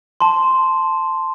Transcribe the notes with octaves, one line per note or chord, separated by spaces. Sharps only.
A5 C6